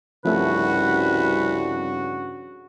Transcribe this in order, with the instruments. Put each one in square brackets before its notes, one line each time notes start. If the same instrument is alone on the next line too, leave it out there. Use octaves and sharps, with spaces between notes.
[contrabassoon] C2 [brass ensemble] G2 C#3 F#4 [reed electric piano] F3 A3 C#4 [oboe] B4